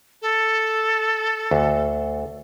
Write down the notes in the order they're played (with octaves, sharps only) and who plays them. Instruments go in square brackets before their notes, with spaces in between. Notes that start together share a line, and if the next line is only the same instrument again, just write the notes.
[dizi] A4
[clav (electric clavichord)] D2